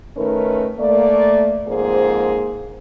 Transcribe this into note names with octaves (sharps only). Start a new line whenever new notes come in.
D#3 A3 C#4 D#4 A#4 B4
A3 A#3 D5
F2 G#2 A#3 G#4 C5